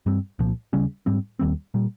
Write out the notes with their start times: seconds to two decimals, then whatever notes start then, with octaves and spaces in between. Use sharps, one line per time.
0.06 G2 G3 C4
0.39 C2 A#2 F3
0.73 D#2 C#3 G3 C#4
1.06 G#2 G3 C4
1.39 D#2 D#3 G3 C4
1.74 A#2 G3